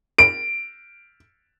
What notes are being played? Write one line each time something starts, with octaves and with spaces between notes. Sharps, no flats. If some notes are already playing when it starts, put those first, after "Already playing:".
D7